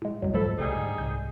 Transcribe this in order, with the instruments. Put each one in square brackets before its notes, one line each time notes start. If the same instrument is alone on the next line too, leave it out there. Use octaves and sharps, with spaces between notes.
[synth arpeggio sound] A2 G#3
[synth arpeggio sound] C2 F#3 [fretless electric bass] F#2
[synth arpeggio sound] D2 F3 B5 [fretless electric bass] G#2 [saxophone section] A4
[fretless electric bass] C2 [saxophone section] G3 D#4 G#4
[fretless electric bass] G#2 D3
[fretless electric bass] C2 G#2 [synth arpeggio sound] G6